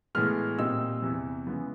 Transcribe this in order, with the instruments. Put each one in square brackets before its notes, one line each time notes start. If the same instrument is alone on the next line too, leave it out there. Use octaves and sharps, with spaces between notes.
[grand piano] A2 E3 G#3 B3 F6
A#2 G3 C4 D#4 E6
E2 C3 E3
C#3 E3 G#3 B3